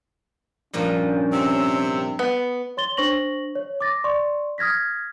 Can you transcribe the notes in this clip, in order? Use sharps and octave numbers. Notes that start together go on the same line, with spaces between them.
G2 A#2 F3 C#4
C3 E6
B3
C#5 C6 A6 G7
D4 C5 C#6 A#6 F#7
C#5
D6 A6 A#6
D5 C6 C#6
D#6 F6 G#6 A#6 B6